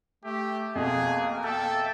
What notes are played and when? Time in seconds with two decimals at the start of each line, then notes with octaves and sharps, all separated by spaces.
0.24 A3 G4
0.75 F2 B2 A#3 G#4
1.44 A4 E5 G5 A5